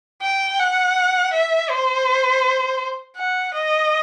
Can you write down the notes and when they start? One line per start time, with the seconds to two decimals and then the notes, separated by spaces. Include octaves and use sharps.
0.22 G5
0.59 F#5
1.33 E5
1.70 C5
3.18 F#5
3.54 D#5